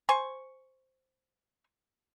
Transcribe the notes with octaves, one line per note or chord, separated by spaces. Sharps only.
C5 G#5 C#6